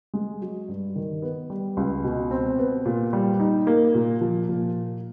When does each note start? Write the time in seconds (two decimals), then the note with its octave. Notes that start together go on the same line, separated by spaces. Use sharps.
0.14 G#3
0.42 F#3
0.68 G2
0.96 D#3
1.22 B3
1.50 G3
1.77 C#2
2.04 B2
2.31 C4
2.59 B3
2.85 A#2
3.13 G3
3.40 D#4
3.67 A#3
3.94 A#2
4.21 F3
4.49 A#2